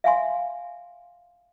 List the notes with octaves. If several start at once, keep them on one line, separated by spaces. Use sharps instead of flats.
E5 F5 G#5 C6